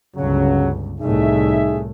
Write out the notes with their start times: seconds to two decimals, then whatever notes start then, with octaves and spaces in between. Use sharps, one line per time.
0.17 G1 C#2 C#3 F#3
1.01 C2 A2 D#4 G#4 E5